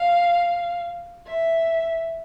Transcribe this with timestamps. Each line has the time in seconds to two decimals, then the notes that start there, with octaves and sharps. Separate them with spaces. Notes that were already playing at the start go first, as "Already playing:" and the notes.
Already playing: F5
1.27 E5